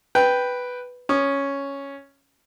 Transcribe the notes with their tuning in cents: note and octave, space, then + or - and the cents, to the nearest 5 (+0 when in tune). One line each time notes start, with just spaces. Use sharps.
B4 +0 G5 +0
C#4 +0 D#6 -35